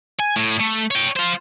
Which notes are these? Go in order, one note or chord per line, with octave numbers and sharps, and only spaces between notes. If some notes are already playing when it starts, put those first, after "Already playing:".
G#5
A2
A3
C#5 G5
F4 C5